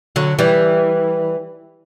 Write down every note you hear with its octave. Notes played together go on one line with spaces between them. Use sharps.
D3 F#3
E3 G3